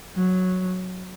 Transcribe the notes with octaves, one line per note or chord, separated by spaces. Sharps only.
F#3